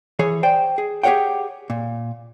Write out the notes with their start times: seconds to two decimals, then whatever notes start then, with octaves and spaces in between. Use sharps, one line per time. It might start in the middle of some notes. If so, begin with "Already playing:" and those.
0.19 E3 G#4 C#5
0.43 C5 D5 G5
0.78 G#4
1.03 G4 G#4 A#4 C#5 F#5 G5
1.70 A#2